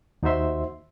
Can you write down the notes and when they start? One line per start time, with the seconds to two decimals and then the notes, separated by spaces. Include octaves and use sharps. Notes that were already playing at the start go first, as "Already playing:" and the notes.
0.23 D#2 D#4 F#4 C5 E5 C6